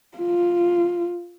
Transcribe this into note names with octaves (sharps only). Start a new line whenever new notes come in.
F4